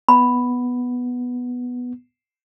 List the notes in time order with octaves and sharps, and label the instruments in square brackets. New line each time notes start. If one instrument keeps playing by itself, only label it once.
[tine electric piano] B3 [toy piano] B5